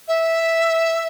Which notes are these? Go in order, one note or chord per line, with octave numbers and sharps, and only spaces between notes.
E5